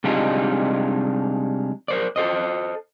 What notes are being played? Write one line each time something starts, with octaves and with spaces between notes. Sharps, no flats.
C3 G3 G#3 D4 D#4 F4
A#4 C5 D5
A4 C5 D#5